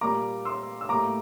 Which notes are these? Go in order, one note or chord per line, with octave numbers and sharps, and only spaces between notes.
A#2 G3 A#3 A#5 D6
C6 E6
E6
A2 G3 A#3 A#5 D6